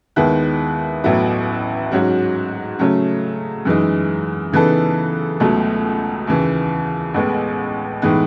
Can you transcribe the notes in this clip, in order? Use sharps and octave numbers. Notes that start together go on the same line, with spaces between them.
D#2 D#3 G#3 B3 E4
A1 A2 F#3 B3 E4
G#2 F#3 C#4 F#4
C#3 F#3 A3 C#4
F#2 E3 G#3 D#4
C#3 E3 B3 D#4 A4
C#2 B2 F#3 A3
D#2 C#3 E3
A1 A2 G#3 B3
A2 E3 G#3 B3 D#4